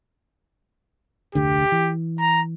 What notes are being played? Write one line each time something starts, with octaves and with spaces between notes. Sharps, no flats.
F1 D2 D3 G4
E3
A#5